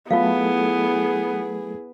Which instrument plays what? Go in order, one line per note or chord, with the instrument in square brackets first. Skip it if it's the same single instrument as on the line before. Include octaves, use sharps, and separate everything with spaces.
[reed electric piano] F#3 A3 A4 [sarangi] B3 [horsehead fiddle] E4 G#4 [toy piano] F4 F5